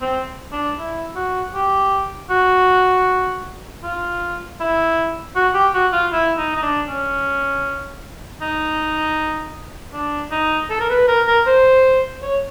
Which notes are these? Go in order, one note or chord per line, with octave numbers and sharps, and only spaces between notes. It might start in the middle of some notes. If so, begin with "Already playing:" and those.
C4
D4
E4
F#4
G4
F#4
F4
E4
F#4
G4
F#4
F4
E4
D#4
D#4
D4
C#4
D#4
D4
D#4
A4
A#4
B4
A#4
A#4
C5
C#5